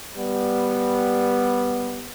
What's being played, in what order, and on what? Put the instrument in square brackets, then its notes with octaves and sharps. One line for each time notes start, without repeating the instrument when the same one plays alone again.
[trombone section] G3 B3